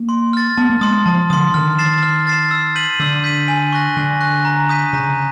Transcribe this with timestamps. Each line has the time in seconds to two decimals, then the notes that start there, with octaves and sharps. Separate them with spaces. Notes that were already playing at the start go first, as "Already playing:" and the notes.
Already playing: A#3
0.09 C6
0.33 F6 A6
0.57 B3 A5
0.70 A#3
0.81 G#3 C6 D#6
1.06 F3 A5
1.30 D3 C6 D#6
1.54 D#3 F6
1.79 A6 C7 E7
2.02 F6
2.27 A6 C7 E7
2.51 E6
2.75 G6 B6 D#7 F#7
3.00 D3 E6
3.24 G6 B6 D#7 F#7
3.48 G#5
3.72 C#6 F#6 A#6
3.97 D3 G#5
4.21 C#6 F#6 A#6
4.45 A#5
4.69 D#6 G6 B6 D#7
4.93 C#3 A#5